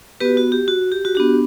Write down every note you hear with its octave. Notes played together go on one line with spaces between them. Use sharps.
B3 F#4 G4 B4
F#4
G4
F#4
G4
F#4
B3 D4 F#4 G4